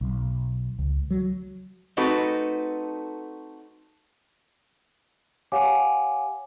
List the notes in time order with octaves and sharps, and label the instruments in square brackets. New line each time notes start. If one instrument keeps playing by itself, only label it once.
[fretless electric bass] B1
C#2
F#3
[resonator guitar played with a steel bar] A3 C4 D#4 F#4 A4 B4
[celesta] G4 C#5 F5 F#5 G#5 D6